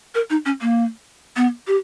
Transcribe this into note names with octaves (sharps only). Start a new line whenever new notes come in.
A#4
D#4
C#4
A#3
B3
G4